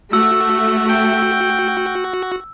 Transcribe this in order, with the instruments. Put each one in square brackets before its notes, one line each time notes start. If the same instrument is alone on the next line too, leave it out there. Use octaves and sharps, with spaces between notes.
[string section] A3 [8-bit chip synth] F#4 [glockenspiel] E6
[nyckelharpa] G5